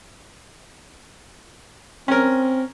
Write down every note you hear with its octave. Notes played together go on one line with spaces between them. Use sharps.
C4 C#4 A#4